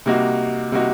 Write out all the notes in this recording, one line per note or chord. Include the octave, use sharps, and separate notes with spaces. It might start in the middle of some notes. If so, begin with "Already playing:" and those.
C3 G3 A#3 D#4 F#4
C3 G3 A#3 D#4 F#4